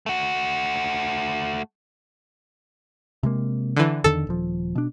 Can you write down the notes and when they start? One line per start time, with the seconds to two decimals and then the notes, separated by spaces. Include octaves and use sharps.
0.06 A3 F#4
3.23 C3 G#3 A#3
3.76 D3 E3
4.04 E2 D3 D#3 A4
4.27 D#1 F3
4.75 B2 D4